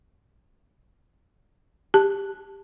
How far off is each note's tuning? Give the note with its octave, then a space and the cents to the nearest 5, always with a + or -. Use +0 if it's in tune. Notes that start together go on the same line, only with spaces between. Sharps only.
G4 +15 A5 +0